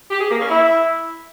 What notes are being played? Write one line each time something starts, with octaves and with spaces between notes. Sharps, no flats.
G4
G#4
A#3
C#4
E4